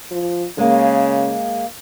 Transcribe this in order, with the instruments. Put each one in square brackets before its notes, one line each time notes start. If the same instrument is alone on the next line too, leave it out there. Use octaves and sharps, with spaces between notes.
[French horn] F3
[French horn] C#3 [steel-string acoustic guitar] G#3 A#3